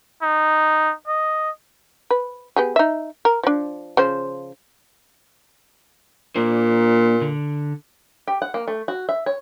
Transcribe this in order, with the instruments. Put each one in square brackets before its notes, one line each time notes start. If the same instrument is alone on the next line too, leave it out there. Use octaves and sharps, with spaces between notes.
[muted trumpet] D#4
D#5
[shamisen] B4
B3 G4 G#4
D#4 E5
A#4
F3 D4
C#3 F3 C5
[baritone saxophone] A#2 [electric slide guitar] A#3 D4 C5
[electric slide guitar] D3
[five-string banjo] G4
F#5
A#3
A3
F#4
E5
C#5